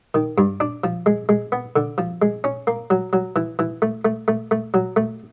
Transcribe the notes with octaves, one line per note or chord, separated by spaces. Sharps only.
D#3
G2
D4
F3
G#3
G#3
B3
D3
F3
G#3
C#4
A#3
F#3
F#3
E3
E3
A3
A3
A3
A3
F#3
A3